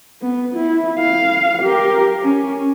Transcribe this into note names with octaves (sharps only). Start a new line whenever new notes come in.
B3
E4
F5
G4 A#4
C#4